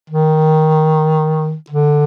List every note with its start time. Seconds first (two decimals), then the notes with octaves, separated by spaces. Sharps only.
0.10 D#3
1.70 D3